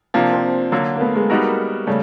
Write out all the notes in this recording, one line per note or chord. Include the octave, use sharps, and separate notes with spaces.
C3 F3 A#3 D4
C4 D4
D3 F#3 A#3
A#3
A3 B3
G#3 A#3
G3 B3 D#4 F#4 A#4
C#3 G3 A3